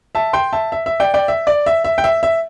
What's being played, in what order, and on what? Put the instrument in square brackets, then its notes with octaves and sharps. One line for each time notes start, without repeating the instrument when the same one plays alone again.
[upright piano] E5 A5
G5 C6
E5 A5
E5
E5
D5 G5
D5 G5
E5
D5
E5
E5
G5
E5
E5